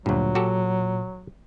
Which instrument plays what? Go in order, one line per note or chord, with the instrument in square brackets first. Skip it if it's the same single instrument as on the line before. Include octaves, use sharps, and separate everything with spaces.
[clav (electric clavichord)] D2 G2 [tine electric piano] A#2 [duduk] F#3
[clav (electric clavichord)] F#4 G4 A4